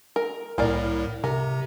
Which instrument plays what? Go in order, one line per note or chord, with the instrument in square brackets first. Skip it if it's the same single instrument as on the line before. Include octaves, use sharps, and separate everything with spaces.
[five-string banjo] A#4
[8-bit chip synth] C2 A2 [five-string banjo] A#3 A#4 D5
[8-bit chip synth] C3 [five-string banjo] A#4